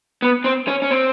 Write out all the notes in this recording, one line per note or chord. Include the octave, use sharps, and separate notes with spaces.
B3
C4
C#4
C#4
C4